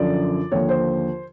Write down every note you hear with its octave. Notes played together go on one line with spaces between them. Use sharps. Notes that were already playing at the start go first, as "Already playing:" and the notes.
Already playing: F#2 D3 F3 D5
D#2 D3 F3 C#5
C5